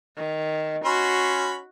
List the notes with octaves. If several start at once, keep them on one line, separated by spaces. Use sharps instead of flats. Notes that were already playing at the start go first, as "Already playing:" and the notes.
D#3
C#4 F#4 B5 C6